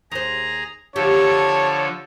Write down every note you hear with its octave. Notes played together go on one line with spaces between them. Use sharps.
D#2 G#4 C5 A#5
D3 F3 G4 A4 C#5